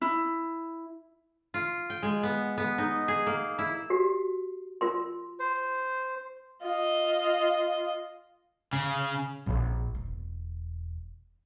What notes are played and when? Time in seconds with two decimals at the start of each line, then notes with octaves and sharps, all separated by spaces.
0.01 E4
1.54 F4
1.90 G5
2.03 G#3
2.23 B3
2.58 B3
2.78 D#4
3.08 G#4
3.26 A#3
3.58 E4
3.90 F#4 G4
4.81 F4 A#4 C6
5.40 C5
6.63 F4 D#5
8.73 C#3
9.46 A#1 C4
9.95 E1